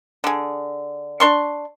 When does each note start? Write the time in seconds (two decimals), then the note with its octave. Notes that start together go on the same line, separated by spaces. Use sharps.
0.24 D3 G#4
1.20 D4 C6 C#6